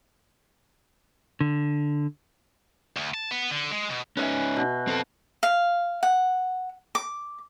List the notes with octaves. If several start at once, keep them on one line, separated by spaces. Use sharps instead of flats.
D3
D2
A5
B3
D3
G#3
B2
C#4 D#4 B4 E5 G#5
B2
C4 A4
F5
F#5
D6